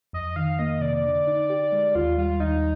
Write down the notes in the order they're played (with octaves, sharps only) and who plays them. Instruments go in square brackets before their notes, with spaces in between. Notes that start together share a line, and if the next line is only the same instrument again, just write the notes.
[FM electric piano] F2 [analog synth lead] D#5
[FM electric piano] D#3 [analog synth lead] F5
[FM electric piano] A#3 [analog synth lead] D#5
[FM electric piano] C3 [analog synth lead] D5
[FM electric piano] D3
D#4
G4
G#3
[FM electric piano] D#2 [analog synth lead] F4
[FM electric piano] G3 [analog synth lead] F4
[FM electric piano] D#2 [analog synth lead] D#4